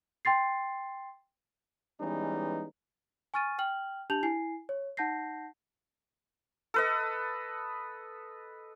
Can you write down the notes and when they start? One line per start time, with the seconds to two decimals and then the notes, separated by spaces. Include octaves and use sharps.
0.25 G5 C6 A6 C7
1.99 E3 G3 G#3 B3 C#4 D#4
3.34 G#5 C#6 F6 A6 D#7
3.59 G5 F6 F#7
4.10 D4 G4 A5 G6 F7 F#7
4.23 E4 G#5 C7
4.69 C#5
4.97 D#4 F#5 A5 G6 A#6 C7
6.74 A4 B4 D#5